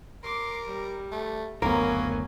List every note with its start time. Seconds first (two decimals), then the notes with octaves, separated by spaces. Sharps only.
0.24 A#4 C6 D6
0.67 G3
1.12 A3
1.62 F#1 D2 F#3 A#3 B3 C#4 A#4